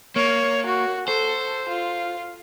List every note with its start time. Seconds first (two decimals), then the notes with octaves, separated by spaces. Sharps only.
0.16 A#3 C#5
0.67 F#4
1.08 A4 C5
1.69 F4